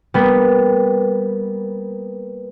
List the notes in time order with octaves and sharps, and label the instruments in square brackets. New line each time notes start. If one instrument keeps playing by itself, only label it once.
[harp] G3 A#3 B3